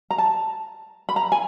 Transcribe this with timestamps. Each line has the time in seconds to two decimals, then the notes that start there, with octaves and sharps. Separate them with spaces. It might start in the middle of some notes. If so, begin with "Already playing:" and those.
0.10 A#5
0.18 A5
1.09 B5
1.16 A#5
1.32 G#5